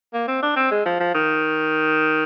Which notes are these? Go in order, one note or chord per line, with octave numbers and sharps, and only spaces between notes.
A#3
C4
D4
C4
G#3
F3
F3
D#3